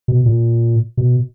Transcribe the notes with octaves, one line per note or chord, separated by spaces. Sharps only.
B2
A#2
B2